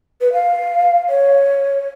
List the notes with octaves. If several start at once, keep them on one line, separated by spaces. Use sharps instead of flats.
B4
F5
C#5